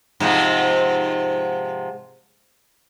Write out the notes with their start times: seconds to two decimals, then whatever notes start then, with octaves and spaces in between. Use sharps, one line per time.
0.20 G#2 C3 F3